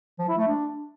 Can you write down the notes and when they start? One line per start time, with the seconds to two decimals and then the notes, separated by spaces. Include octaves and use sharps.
0.19 F3
0.28 E4
0.37 A3
0.47 D4